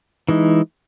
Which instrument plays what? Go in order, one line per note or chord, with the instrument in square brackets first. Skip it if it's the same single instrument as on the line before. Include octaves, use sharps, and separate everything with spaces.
[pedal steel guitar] E3 G#3 D#4